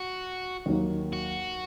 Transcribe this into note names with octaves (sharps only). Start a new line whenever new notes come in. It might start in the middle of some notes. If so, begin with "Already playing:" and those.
Already playing: F#4
D#2 D#3 F#3 A#3
F#4